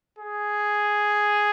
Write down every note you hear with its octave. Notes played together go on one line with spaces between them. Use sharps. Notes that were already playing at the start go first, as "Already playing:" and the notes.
G#4